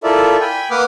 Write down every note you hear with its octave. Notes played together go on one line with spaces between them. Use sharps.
E4 F4 A4 A#4 D5 E5
G5 G#5 B5
A#3 B4 F#5 D6 D#6 F6